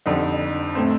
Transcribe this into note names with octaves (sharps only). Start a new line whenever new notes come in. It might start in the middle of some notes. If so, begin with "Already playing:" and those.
F2 D3 G3 C4 D#4
A2 A3 C4